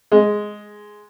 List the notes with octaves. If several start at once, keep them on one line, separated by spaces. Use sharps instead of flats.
G#3